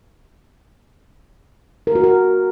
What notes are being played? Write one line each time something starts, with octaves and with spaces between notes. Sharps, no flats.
A#4
F#4
A#4